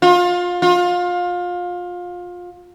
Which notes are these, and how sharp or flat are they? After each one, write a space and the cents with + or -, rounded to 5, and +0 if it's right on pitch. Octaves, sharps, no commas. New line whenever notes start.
F4 +25
F4 +25